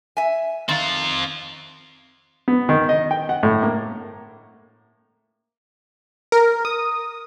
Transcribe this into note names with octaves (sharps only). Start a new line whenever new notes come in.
E5 G#5
D#3 C4 F5
B3
D#3
D#5
G5
F#5
A2
A#3
A#4
D#6